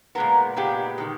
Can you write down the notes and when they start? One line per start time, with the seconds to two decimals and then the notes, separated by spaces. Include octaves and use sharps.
0.15 A#2 G#3 B3 A#4
0.56 A#2 G#3 B3 G4
0.98 D#3 G#3